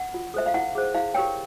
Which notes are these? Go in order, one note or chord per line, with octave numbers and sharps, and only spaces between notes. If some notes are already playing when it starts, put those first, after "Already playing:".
Already playing: F#5
F4
A4 C5 E5
F5
E4 F#5
G#4 C5
E4 F5
G4 A#4 C#5 G5